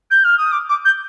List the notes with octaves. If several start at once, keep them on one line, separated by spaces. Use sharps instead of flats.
G6
F6
D#6
D6
D6
G6